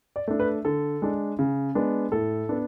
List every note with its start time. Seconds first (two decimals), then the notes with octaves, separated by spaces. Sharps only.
0.16 D5
0.28 A3 D4
0.40 B4
0.65 D3 A4
1.02 G#3 D4
1.39 C#3
1.75 G#3 B3 D4
2.12 A2 A4
2.49 B3 D4